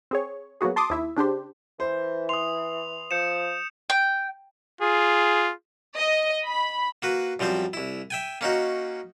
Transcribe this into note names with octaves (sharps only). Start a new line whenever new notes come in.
C4 G#4 C#5
F#3 A#3 B3 F#4 G#4
A5 C6 D6 D#6
D#2 E4 E5
C#3 D4 G4 C5
E3 C5
C6 D#6 F7
F3 G6 C#7 E7
G5
F4 G#4
D#5
B5
A#3 F#4 B4
F#2 F3 G3 C4 C5
C2 E4
E5 G5 G#5
A#3 C#4 D#4 F#4